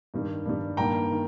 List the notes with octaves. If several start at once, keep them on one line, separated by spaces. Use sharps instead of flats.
G2 D#3 G3
G2 D#3 G3
G2 D#3 A#3 G5 A#5
D#3